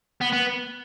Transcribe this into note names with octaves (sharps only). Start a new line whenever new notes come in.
B3
B3